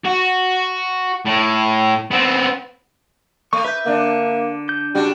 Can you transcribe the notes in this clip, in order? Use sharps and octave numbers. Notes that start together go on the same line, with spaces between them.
F#4
A2
B3 C4
A3 C#6
B4 E5 G6
D3 A#3 D4
G6
C#3 G3 D4 F#4